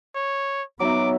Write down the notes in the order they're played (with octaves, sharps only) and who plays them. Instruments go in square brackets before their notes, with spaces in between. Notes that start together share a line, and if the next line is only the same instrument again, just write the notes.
[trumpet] C#5
[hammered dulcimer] F#3 D#4 E5 [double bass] B3 [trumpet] D6